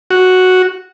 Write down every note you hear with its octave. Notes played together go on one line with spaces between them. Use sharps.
F#4